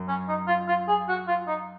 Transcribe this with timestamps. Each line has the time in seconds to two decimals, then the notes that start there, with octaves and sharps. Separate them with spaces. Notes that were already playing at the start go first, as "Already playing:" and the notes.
Already playing: F#2
0.08 C#4
0.28 D#4
0.48 F4
0.68 F4
0.88 G#4
1.09 F#4
1.28 F4
1.47 D#4